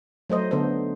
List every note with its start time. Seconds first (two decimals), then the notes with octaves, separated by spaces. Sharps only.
0.30 F#3 A3 C5 D#5
0.51 D3 B3 A4 C5